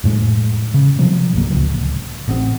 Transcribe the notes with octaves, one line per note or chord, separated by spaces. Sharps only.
F2 A2 G#3
C#3
C3 F3 F#3
G1 C2 A#3
D1 C#2
A1 B3 C4